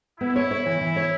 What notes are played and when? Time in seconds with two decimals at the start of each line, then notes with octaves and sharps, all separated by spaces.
0.20 B3 E4
0.36 C#5
0.51 C#5
0.66 E3
0.81 E3
0.96 C#5